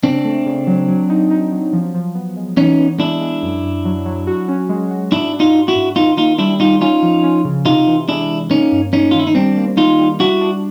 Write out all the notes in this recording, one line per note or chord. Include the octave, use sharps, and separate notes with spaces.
C#3 C4 D4
A3
C#3
F#3
F#3
D#4
D#4
F#3
F3
F3
B3
G#3
E3 C#4 D#4
B3
G#3 D4 E4
G#3
F#2
F#2
F#3
F#3
F#4
C#4
G#3
F#4
G#2 D4 E4
D4
D#4 F4
D4
E4 F#4
G#2
D#3 D#4 F4
A#3 D#4 F4
G3 D4 E4
G3 D#4 F4
C#4 D#4 F4
F3
C#4
C#3
C3 D#4 F4
E3
G#3 D4 E4
C3
A#3 C#4 D#4
G2
A#3 C#4 D#4
F4
D#3
E4
D#4
G3 C4 D4
A#3
D#3 D#4 F4
G3
D4 E4 F#4
D4